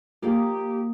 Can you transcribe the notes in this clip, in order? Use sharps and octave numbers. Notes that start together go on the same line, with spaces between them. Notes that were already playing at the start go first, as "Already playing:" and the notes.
A#3 F4 G4 G#4 D5